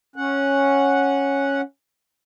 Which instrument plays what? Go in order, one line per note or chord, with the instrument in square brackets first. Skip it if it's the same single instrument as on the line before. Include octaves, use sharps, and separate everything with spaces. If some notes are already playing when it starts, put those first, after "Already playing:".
[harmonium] C#4 F#5